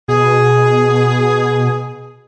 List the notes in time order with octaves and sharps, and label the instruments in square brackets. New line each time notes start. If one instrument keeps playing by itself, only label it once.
[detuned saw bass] B2 [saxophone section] G#4